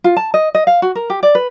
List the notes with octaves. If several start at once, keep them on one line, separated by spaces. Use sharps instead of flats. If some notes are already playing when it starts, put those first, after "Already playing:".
F4
A5
D#5
D#5
F5
F#4
A#4
G4
D5
B4